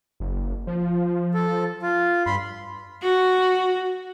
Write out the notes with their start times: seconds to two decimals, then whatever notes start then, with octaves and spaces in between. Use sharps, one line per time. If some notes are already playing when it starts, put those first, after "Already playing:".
0.20 F#1
0.67 F3
1.34 A4
1.82 F4
2.26 G2 B5 C6
3.03 F#4